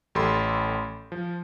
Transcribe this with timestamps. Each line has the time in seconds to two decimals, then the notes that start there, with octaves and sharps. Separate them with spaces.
0.15 A1 G4 A4 B5 C6
1.12 F3